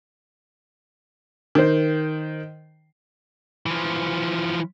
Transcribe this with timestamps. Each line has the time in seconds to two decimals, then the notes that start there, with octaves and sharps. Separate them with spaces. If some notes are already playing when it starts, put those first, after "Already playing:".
1.55 D#3 C5
3.66 E3 F3